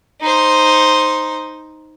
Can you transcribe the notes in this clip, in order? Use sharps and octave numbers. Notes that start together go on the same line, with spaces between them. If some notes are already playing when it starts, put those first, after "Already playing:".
D#4 C5